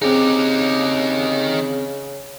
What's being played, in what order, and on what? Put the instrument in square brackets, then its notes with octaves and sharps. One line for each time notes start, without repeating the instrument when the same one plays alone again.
[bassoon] C#3 [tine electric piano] C4 G#4 [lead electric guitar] D#4 G4